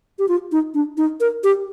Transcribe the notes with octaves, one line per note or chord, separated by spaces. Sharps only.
G4
F4
D#4
D4
D#4
A#4
G4